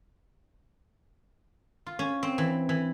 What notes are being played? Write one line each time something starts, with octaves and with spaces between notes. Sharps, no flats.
F4
C#4
C4
E3
E3